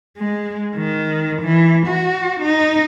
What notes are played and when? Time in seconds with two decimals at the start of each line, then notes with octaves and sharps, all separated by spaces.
0.18 G#3
0.76 D#3
1.43 E3
1.87 F#4
2.41 D#4